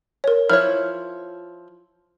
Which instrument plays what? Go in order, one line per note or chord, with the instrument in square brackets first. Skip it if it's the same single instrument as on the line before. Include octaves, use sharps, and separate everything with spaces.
[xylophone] A#4 C#5
[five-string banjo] F3 E4 C#5 [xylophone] F6